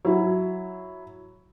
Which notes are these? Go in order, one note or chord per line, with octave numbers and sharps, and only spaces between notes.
F#3 E4